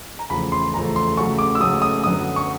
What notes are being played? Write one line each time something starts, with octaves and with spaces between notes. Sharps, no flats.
A#5
E2 C#3 F3 A3 B5
C6
E2 C#3 F3 A3 A#5
C6
C#3 F#3 A3 C#6
D6
E6
C#3 F#3 A3 D#6
D#6
F#2 D3 F#3 B3 D#6
C#6